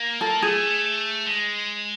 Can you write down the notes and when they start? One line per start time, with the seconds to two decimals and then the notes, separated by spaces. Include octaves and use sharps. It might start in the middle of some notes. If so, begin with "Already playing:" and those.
Already playing: A#3
0.21 A4
0.42 A3 G#4
1.26 G#3